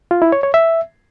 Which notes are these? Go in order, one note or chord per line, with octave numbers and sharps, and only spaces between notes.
F4
E4
C#5
C#5
E5